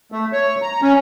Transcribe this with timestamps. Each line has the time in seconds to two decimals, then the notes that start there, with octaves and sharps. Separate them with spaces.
0.12 A3
0.33 C#5
0.62 A#5
0.82 C#4